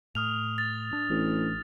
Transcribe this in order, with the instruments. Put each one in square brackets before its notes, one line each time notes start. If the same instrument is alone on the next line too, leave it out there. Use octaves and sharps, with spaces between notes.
[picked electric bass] A2 [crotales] D#6 F6 F7
[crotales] A6
[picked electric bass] D4
[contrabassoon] A1